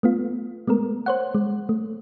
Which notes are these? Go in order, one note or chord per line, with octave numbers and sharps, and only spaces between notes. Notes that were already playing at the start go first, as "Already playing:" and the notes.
A3 B3 F4
G#3 A3 B3 A#4
C5 C#5 F#5
G#3
A3